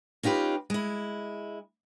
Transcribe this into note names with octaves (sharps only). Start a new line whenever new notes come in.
C#4 D#4 F4 G4 B4
G#3 E4